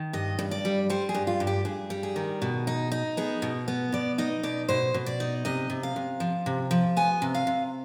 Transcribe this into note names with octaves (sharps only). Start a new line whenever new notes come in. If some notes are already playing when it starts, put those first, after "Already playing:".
Already playing: D#3
G2 D#5
G2
D5
G3
G3 C5
G#4
G2
F4
G2
G4
G2 G#4
G3
G#4
D#3
B2
D#4
D#4
B3 G#4
B2
B3
B2 D5
D#4 D#5
B2 D5
B2 C5
B2
D5
D#4
C3 D#5
C3
F5
C3
F3
C3
F3
B3 G#5
C3
F5
C3